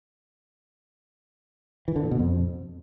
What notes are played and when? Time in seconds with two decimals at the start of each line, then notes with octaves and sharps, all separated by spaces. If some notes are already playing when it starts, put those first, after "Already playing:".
1.88 E3
1.96 D3
2.04 A#2
2.11 B2
2.19 F2